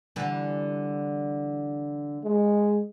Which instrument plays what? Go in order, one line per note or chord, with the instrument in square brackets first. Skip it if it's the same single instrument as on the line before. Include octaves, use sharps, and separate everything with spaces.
[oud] D3 E3 G3
[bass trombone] G#3